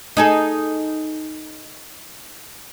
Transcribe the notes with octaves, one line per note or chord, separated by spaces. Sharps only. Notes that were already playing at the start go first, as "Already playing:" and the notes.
D#4 G#4 A4